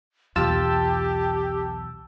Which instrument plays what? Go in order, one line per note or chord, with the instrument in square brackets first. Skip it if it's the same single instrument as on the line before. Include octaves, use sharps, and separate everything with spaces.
[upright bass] B1 E2 [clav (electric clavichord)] F4 [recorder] G4 [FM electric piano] A5 E6